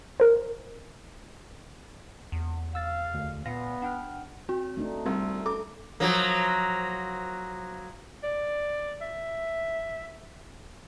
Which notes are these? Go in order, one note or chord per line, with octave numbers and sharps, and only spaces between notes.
A#4 C5
E2
F5 E6 A6
D2
A#2 B3 F5 A#6
D4 F#5 G5 F6
C4 F#4
A3 D4 D#4
C2
A4 D6
F3 F#3 A#3
D5
E5